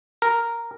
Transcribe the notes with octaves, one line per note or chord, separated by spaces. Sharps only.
A#4